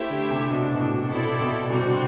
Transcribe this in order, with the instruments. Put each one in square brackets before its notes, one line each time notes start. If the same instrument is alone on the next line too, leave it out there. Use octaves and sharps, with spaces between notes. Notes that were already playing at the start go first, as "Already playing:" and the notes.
Already playing: [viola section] A3 E4 G4 C5 E5
[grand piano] D3
C3
[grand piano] B2 [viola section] A3 D4 F#4
[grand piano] B2
A2
[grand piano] B2 [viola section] C4 E4 A4 D5
[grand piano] B2
[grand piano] C3 [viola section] G3 C4 F#4
[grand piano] D3